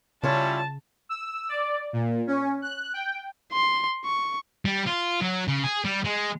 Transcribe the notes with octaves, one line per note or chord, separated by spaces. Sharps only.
C#3 G3 C#4 E4 F4 C#5 A5
E6
D5
A#2
C#4
F#6
G5
C6
C#6
G3
F4
F#3
C#3
G#4
G3
G#3